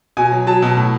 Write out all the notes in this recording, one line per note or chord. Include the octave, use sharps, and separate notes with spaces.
B2 G#5
F#3
F#3 A5
B2
A2